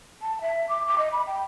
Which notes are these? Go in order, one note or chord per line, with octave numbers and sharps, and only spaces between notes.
A5
E5
D6
D6
D#5
B5
G5